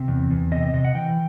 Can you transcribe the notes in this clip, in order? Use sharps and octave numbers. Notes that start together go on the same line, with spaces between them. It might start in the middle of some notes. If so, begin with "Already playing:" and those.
Already playing: C3
E2
E2
C3 D#5
D#5
C3 D#5
F#5
E3 G5